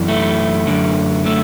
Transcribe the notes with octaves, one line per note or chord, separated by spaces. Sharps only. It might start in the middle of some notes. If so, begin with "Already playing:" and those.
Already playing: F#2 E3
A3
F#2 D3
A3